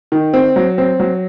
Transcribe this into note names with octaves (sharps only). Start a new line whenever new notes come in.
D#3
C4
F#3
C4
F#3